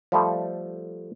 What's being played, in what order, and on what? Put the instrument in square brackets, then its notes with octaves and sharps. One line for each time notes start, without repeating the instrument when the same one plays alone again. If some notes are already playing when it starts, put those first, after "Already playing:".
[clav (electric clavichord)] F3 G3 A3 A4